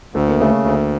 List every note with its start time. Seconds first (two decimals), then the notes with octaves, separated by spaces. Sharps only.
0.15 D2 A3
0.29 A#3
0.39 C#3 A3
0.64 D2